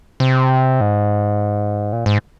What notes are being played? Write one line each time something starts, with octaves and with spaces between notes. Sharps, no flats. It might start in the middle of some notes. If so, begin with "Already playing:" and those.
C3
G#2
A#2
G#2